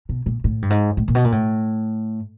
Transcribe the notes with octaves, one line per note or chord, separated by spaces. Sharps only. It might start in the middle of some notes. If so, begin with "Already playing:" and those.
B2
A#2
A2
G2
G#2
A2
A#2
B2
A#2
A2